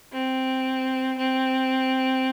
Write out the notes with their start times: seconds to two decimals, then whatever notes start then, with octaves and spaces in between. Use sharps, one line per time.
0.13 C4
1.18 C4